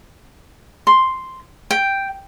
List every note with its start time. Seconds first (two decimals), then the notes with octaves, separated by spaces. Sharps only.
0.87 C6
1.71 G5